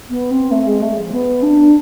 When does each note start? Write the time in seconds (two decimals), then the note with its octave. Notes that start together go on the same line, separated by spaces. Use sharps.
0.09 B3
0.30 C4
0.50 A3
0.66 G#3
0.81 A3
0.96 F3
1.11 B3
1.42 D4